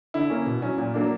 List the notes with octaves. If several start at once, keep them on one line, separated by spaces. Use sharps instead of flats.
D3 E4
A#3 C#4
B2
F#3 C#4
A#2
F#3 A#3 D4